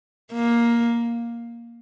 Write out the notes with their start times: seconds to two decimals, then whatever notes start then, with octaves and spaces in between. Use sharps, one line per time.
0.33 A#3